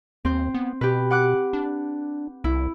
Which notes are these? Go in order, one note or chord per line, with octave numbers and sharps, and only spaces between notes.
D#2 C4 C5
B3
B2 G4 B4
F#5 D6 F#6
D4
C2 E4